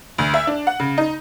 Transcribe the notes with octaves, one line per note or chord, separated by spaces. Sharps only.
D2
E5
D4
F#5
C#3
D#4